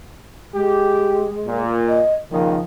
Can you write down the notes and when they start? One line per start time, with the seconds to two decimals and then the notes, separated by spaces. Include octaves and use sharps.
0.54 G#3 G4
1.47 A#2
1.88 D#5
2.31 C#2 A#2 D#3 F3